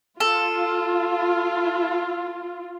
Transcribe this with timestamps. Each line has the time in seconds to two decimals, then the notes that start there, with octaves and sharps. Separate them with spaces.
0.20 F4 A4